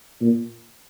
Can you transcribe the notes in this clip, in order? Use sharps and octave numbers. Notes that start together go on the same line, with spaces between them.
A#2